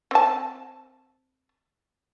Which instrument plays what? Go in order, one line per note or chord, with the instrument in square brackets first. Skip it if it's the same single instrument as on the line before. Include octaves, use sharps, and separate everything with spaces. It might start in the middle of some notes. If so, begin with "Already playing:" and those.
[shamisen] C4 A5